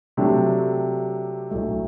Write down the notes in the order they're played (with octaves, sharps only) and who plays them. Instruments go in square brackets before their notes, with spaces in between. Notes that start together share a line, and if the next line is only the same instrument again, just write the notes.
[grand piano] C3 F#3 A3 D4
B1 A2 F#3 A3